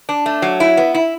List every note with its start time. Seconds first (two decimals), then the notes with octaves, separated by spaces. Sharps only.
0.09 D4
0.26 A3
0.42 F#3
0.60 E4
0.77 B3
0.94 E4